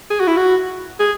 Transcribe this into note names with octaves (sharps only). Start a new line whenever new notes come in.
G#4
F#4
E4
F#4
G#4